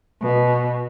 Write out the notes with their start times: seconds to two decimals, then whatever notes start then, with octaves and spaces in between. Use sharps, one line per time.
0.20 B2